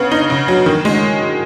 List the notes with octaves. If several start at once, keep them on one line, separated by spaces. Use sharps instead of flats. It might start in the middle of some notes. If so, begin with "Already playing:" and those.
Already playing: C#3 B3
D#4
C#3
F#3
D#3
G#3